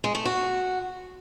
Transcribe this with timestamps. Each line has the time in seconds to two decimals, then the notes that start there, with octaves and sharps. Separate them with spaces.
0.04 G#3
0.15 A3
0.25 F#4